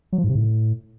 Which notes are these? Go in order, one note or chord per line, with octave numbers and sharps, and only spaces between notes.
F#3
F3
G#2
C3
A2